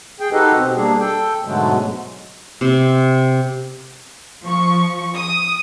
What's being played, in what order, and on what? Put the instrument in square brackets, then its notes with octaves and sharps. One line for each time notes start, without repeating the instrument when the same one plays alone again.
[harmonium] G#4 G5
D#4 F#4 G4 A4 B4 D#5
B2 C4
G3 A#3 D4 G#4
A4 G5
G#2 B2 D3 F#3 G#3 A3
[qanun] C3
[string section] F3 C#6
D#6